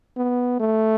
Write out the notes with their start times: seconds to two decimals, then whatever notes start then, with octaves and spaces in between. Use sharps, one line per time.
0.17 B3
0.60 A3